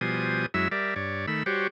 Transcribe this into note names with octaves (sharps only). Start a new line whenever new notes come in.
B2 F3 G3 C5 G#5 D#6
F#2 F#3 G#3 E4 E5 E6
G3 A#4 D5 E5
G2 C#5 D5
D#3 A3 B5 E6
G3 F#4 G4 C5 C#5